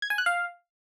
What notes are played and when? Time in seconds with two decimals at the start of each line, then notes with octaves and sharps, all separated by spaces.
0.02 G#6
0.10 G#5
0.18 F#6
0.26 F5